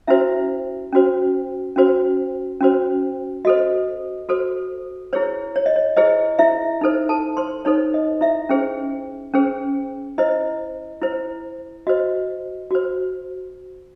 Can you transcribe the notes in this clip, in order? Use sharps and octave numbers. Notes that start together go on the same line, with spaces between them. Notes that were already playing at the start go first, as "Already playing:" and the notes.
C#4 E4 F#4 C5 E5
C#4 F#4 C5
C#4 F#4 C5
C#4 F#4 C5
F#4 A4 C5 D#5
F#4 A4 C5
E4 G#4 C5 C#5
C#5
D#5
C#5
E4 G#4 C5 D#5
E4 E5
D#4 A4 C5
A4 A5
C5 C6
D#4 A4 C5 C#5
D#5
E4 E5
C#4 G#4 C5
C#4 G#4 C5
E4 C5 D#5
E4 C5
F#4 C5 D#5
F#4 C5